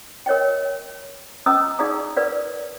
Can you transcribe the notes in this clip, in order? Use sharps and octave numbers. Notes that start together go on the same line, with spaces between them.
A#4 C#5 D#5 G5
C#4 D#5 A#5 D#6 E6
D#4 G#4 D5 F5 A#5 D#6
A#4 B4 D5 F5